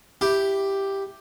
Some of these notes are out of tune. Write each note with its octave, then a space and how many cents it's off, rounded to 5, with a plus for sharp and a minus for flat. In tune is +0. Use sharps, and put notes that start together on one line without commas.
E4 +0 G4 +0